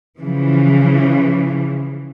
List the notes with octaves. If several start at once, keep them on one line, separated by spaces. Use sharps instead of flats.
C#3 E3 F3